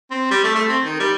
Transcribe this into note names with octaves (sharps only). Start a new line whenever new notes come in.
C4
G3
A3
A3
C4
D#3
G3